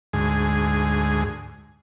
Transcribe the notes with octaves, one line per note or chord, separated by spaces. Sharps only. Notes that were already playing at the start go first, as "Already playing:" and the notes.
D2 G#2 G#4